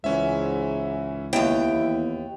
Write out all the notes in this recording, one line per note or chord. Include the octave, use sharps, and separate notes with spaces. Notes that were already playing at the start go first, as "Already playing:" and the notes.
C#2 G#2 E3 C#4 E5
D#2 B3 E4 G5
E2